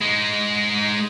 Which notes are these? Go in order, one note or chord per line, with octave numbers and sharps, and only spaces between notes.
G#3 D#4